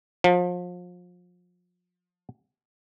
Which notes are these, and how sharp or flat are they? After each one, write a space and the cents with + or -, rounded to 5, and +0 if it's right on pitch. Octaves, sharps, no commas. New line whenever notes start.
F3 +35